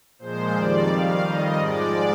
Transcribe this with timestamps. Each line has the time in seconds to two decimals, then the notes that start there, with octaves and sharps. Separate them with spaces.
0.19 A#2 F3 G#3 C5
0.53 F2 D#3 G3 D5
0.87 F2 D#3 G3 F5
1.22 F2 D#3 G3 D#5
1.56 G#2 F3 G#3 D5